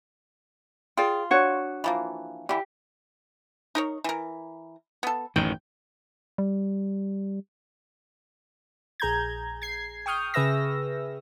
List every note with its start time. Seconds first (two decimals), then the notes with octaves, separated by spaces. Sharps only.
0.97 F4 G#4 D5 G5
1.31 D4 F#4 C#5
1.84 E3 F3 A#3
2.49 D3 E3 G4
3.75 D#4 A#4 C#5
4.04 E3 A#4
5.03 B3 A4
5.36 A1 F#2 D#3 G5
6.38 G3
9.00 A#1 G#4 A#5 G6 G#6
9.62 G#6 C7
10.06 G5 C#6 D#6 F6 G6
10.34 C#3 G#4 B4 E5 E6 A#6